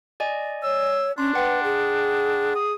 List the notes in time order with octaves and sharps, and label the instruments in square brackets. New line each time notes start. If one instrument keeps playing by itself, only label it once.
[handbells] D5 D#5 G#5
[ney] C#5 [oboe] E6
[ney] C#4 [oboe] D4 [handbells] C6
[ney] B4 [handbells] F#5 G5 C6
[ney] G#4
[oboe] D#6